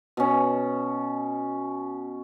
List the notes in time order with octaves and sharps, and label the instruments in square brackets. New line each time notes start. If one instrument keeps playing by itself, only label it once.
[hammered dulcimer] B2 C#4